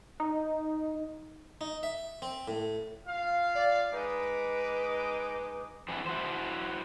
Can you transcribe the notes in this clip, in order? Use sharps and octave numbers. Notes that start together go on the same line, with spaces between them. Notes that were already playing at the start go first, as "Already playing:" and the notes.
D#4
D#4
E5
C4
A2
F4 F5
D5
G#3 D#4 B4 D6
E3 C4 D4 E4
E4 F#4 C5